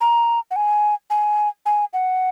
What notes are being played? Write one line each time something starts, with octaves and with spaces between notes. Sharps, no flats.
A#5
F#5
G#5
G#5
G#5
F#5